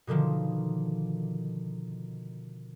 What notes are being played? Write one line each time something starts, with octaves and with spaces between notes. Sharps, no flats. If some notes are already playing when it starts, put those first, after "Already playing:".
B2 D3 D#3 F3